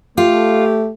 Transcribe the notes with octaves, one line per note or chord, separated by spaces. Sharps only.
A3 F4 G4